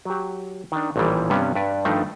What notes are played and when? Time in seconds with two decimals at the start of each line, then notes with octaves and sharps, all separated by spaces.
0.05 F#3 G4
0.72 D#3 D4
0.96 A1 A#2 D#3 E3 G3
1.30 G2 C3 G3 B3 C#4
1.55 G2 B4 D5
1.85 G2 D#3 F3 A3 D4 D#4